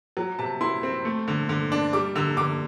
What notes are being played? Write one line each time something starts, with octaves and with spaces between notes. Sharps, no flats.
F#3
C3 A5
E4 C6
C4
A3
D3
D3
D4
G3 D6
D3 E6
D3 D6